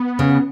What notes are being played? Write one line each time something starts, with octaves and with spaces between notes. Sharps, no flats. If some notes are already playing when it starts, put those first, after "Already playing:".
Already playing: B3
C#3